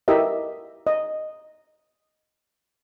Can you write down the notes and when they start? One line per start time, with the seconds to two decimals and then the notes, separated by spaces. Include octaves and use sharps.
0.08 E4 G4 A#4 D#5 E5
0.87 D#5